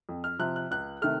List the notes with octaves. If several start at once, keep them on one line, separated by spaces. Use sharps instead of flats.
F2
F6
C3 F3 F#6
F#6
C#2 F#6
C3 D#3 A3 F6